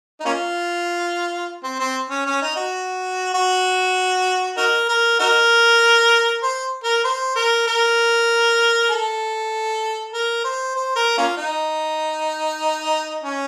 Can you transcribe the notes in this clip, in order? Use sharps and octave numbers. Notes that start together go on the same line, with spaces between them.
D#4
A#3 C#4 F4
C4
C4
C#4
C#4
D#4
F#4
F#4
D#4 F#4 A#4
A#4
D#4 F#4 A#4
C5
A#4
C5
A#4
A#4
A4
A#4
C5
C5
A#4
A#3 C#4 F4
D#4
C#4